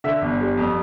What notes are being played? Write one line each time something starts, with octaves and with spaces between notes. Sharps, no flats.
D3 E5
G1
G3
F2